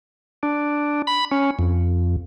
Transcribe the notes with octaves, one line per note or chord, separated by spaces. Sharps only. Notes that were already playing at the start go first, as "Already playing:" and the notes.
D4
B5
C#4
F2